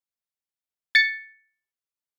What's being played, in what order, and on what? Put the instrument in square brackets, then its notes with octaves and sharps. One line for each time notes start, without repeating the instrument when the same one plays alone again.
[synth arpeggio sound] A6 C#7